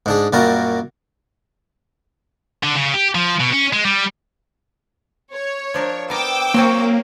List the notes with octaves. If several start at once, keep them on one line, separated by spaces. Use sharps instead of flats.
G#2 D4 G#4
F#2 A#2 G3 F#4 A#4
D3
C#3
G4
F3
B2
C#4
G#3
G3
C#5
F3 D4 A#4
B3 A#4 G5 D6 E6
F#3 A#3 C4 C#4